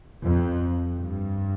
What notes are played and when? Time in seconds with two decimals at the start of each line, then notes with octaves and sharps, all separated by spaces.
0.24 F2
0.98 G2